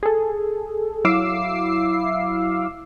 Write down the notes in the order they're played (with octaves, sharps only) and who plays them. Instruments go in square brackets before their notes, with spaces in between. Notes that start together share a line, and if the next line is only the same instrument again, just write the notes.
[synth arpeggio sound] G#4 A4
F#3 E4 F5 D6 E6 C7